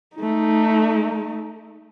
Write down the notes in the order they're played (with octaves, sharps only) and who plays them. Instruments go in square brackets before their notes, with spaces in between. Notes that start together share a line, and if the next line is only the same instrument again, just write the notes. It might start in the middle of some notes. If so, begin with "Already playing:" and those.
[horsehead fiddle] A3 D#4